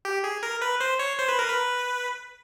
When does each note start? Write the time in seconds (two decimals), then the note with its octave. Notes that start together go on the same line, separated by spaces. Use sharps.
0.05 G4
0.24 G#4
0.43 A#4
0.62 B4
0.81 C5
0.99 C#5
1.19 C5
1.29 B4
1.39 A#4
1.48 B4